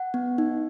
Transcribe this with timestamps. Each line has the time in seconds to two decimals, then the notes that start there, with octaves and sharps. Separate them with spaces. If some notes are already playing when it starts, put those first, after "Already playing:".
Already playing: F#5
0.14 B3
0.38 D#4